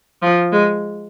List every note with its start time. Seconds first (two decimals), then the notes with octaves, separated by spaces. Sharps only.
0.22 F3
0.52 G#3